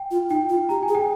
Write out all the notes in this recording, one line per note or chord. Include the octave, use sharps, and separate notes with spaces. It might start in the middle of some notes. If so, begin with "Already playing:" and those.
Already playing: G5
F4
D#4 G5
F4
G4 A#5
G#5
G#4
G5